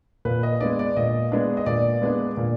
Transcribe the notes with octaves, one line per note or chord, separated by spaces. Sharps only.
A#2 B4
D#5
G#3 B3 D4 D5
D5
A#2 D#5
G#3 B3 D4
D#5
A#2 D5
G#3 B3 D4
A#2